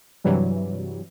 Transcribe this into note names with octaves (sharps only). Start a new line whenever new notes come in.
G2 C3 E3 F#3 G3